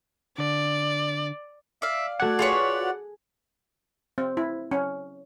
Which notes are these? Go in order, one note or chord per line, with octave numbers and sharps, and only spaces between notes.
D3 D5
D5 E5 F5
A3 F#4 D5 F#5 G#6
F4 G#4 B4 C#5
C4
E4
C#4